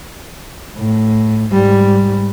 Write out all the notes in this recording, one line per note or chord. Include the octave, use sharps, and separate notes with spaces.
A2
G#2 G3